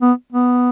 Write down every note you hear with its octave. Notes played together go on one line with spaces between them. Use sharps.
B3
B3